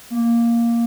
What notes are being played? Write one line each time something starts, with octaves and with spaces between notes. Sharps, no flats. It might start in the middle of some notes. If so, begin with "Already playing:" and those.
A#3